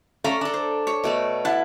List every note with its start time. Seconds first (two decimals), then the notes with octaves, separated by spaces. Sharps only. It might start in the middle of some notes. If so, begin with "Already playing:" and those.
0.24 A3 C#4 D5 F5 A#5 D6
0.41 D4 A4
0.54 C5
0.87 C#5
1.04 B2 A3 D5
1.45 E4 F#5 A5